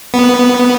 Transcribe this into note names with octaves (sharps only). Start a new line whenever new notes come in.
B3